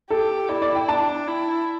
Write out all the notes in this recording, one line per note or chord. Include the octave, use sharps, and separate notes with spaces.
G4 A4
E4 D5
D5
G5
D4 A5
E4